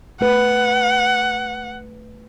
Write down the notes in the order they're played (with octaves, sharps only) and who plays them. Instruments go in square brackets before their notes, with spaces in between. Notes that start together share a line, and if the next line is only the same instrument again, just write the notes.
[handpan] A3 B4 [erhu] F#5